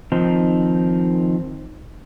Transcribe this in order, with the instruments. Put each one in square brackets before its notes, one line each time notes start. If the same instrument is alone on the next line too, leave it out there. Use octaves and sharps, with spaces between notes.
[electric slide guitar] D#3 F3 C4 D#4